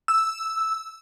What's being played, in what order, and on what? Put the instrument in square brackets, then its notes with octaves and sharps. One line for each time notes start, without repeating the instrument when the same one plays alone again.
[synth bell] E6